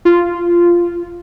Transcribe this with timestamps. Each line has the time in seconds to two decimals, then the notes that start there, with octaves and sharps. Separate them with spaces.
0.05 F4